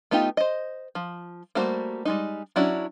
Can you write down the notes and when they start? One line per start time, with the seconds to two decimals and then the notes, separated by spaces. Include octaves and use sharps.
0.11 A3 B3 D#4 F4 G4
0.37 C5 D#5
0.95 F3
1.55 G3 A3 A#3 F#4 C5
2.05 G3 G#3 D#4
2.56 F#3 C#4 D4 E4 F#4